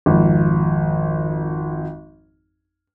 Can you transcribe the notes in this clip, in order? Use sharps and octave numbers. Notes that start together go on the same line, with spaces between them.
G#1 F2